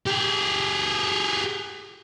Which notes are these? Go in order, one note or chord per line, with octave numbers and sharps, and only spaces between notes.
G4 G#4